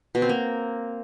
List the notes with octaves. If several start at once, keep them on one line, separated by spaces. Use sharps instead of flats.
B2
C4
A#3